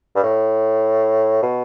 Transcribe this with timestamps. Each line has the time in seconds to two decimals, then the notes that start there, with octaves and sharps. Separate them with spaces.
0.16 G2
0.23 A2
1.43 B2